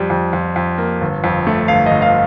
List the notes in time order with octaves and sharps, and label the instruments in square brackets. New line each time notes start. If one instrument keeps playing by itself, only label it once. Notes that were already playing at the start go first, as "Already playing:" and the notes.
Already playing: [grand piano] F2 G3
F2
F2
F2
A#3
G1
F2
A3
G1 F5
G1 D#5
F5